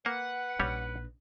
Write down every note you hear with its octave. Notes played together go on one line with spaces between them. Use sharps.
A#3 B4 F#5
A#1 G3 C#4 D#4 C#5